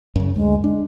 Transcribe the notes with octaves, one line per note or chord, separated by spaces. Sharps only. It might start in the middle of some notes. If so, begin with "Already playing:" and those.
F#2 C#3
D2 G#3
G#3 D4